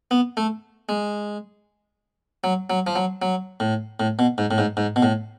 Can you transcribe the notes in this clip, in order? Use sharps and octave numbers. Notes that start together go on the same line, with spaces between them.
B3
A3
G#3
F#3
F#3
F3
F#3
F#3
A2
A2
B2
G#2
A2
G#2
G#2
B2
A2